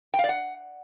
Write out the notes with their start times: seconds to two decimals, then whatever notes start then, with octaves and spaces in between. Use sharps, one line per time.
0.14 G5
0.19 F5
0.24 D5
0.29 F#5